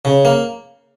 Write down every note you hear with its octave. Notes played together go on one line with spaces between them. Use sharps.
C#3
A#3